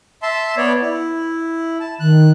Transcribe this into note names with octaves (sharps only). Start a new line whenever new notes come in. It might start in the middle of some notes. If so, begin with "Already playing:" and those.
E5 A5 C6
B3 C#5 D5
E4
A5
D#3 F#6